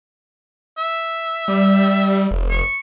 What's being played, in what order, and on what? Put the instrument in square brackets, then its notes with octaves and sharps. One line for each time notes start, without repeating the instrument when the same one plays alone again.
[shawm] E5
[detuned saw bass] G3
F1
[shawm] C#6